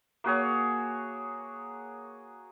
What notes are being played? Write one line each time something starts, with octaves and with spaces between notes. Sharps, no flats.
A#3 F#4 G#4 C#5